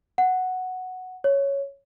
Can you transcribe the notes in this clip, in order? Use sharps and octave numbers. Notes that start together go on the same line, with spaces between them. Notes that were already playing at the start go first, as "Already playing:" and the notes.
F#5
C#5